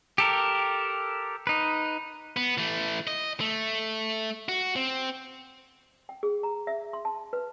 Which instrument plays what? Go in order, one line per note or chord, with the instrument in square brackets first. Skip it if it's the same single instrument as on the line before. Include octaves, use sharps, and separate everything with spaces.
[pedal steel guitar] G4 A4 A#4
D#4 B4
[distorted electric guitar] B3
E3 A3
D#5
A3
F#4
C4
[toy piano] G5
G#4
A#5
E5
C6
A5
B4